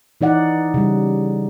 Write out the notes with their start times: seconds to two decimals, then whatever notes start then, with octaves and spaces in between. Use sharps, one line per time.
0.21 E3 D#4 D5 F#5
0.74 C#3 G3